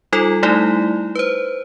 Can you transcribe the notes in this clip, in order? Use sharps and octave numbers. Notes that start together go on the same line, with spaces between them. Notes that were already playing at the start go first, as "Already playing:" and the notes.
G3 D#4 F4 A4
G3 A3 D#4 E4
B4 C5